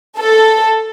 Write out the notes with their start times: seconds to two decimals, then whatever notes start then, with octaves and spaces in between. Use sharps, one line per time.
0.19 A4